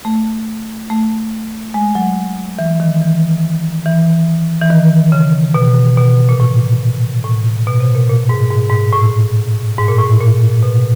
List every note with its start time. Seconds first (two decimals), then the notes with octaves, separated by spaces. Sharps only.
0.05 A3
0.90 A3
1.74 G#3
1.95 F#3
2.59 E3
2.80 D#3
3.02 E3
3.85 E3
4.61 E3
4.70 D#3
5.12 C#3
5.54 B2
5.97 B2
6.29 A#2
6.40 A2
7.24 A2
7.67 B2
7.80 C3
7.95 A#2
8.09 A#2
8.29 G#2
8.51 G#2
8.70 G#2
8.93 A2
9.78 G#2
9.89 A#2
9.99 A2
10.21 A#2
10.63 B2